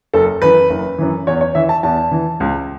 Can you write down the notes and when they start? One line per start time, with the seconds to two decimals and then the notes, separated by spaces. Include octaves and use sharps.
0.14 F#1 A4
0.42 F#2 E3 B4
0.70 F#1
0.98 F#2 E3
1.27 E2 C#5
1.41 C#5
1.55 E3 E5
1.69 A5
1.83 E2 A5
2.11 E3
2.40 C#2